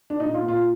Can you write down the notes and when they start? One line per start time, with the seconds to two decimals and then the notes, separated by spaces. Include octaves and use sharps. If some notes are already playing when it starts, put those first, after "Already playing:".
0.10 D4
0.19 A#2 D#4
0.34 F4
0.42 A#2
0.48 F4